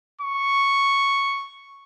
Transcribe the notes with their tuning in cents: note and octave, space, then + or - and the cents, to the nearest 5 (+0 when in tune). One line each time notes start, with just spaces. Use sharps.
C#6 +0